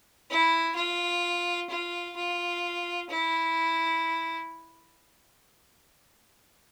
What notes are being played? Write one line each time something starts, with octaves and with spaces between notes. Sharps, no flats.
E4
F4
F4
F4
E4